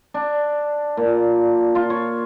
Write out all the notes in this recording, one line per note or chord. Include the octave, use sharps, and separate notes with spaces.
D4
A#2
F4
C#5